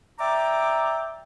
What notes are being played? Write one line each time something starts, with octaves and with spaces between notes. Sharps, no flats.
D5 E5 G5 A#5 D6